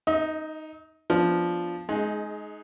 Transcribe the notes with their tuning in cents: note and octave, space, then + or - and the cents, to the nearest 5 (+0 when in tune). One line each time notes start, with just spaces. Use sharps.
D#4 +0 D#5 +40
F3 +0 B3 +5 D4 +0
G#3 +25 D#4 +0 G#4 +0